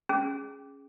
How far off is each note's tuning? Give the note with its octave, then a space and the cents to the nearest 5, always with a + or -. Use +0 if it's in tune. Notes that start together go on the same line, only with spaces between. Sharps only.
C#4 +0 G#4 +0